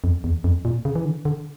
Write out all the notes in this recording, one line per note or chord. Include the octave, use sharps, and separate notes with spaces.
F2
E2
F2
A#2
C#3
E3
D3
D3